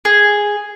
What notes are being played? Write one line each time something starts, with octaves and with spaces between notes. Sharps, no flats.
G#4